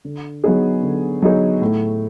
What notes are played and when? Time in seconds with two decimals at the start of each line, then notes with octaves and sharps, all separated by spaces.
0.05 D3
0.44 F#3 B3 D#4 G#4
0.83 D3
1.22 F#3 B3 D#4 G#4
1.62 A2